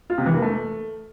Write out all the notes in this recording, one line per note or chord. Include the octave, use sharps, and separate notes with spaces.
F4
C3
E3
A#3
A3